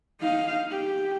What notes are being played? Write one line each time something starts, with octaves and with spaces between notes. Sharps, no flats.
D#4 F5
G4